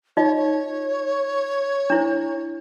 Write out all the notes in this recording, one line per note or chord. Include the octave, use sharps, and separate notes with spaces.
D#4 F4 C#5 D#5
C#5
D4 E4 C5